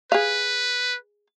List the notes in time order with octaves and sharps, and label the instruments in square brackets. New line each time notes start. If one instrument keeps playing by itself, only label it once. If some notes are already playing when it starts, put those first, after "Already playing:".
[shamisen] G#4 F5 [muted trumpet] B4